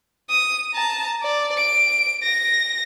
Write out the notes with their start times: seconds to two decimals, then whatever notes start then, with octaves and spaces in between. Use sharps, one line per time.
0.30 D#6
0.74 A5 A#5
1.23 D5
1.57 D7
2.23 A#6